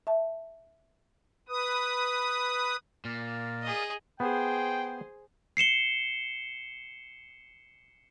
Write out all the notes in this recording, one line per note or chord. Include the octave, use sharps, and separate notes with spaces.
E5 A5
B4 D#6
A#2 A#4 D5 F5
G#4 D#5
B3 G#4 C5 G5
C7 C#7 E7 G7